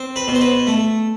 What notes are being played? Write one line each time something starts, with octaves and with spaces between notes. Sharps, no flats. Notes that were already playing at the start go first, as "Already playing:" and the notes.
Already playing: C4
B4
B2
C5
B4
A3